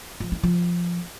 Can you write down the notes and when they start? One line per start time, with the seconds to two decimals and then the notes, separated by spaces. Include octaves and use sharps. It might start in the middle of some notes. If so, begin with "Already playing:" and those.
0.20 F3
0.32 E4
0.43 F3